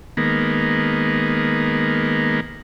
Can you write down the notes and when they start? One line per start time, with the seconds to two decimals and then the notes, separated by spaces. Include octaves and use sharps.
0.17 D#3 G#3 A#3 B3